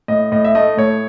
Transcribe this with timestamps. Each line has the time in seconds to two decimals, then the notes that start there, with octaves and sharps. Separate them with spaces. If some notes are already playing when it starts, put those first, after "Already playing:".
0.08 A2 D#5
0.32 A2 D#5
0.45 E5
0.55 A3 D#5
0.77 A2 C#5